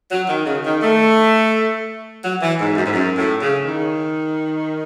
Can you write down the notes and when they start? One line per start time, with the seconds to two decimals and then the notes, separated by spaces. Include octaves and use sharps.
0.11 F#3
0.29 D#3
0.46 C#3
0.64 D#3
0.82 A3
2.23 F#3
2.41 E3
2.58 G#2
2.76 F#2
2.85 G#2
2.94 F#2
3.17 A2
3.42 C#3
3.65 D#3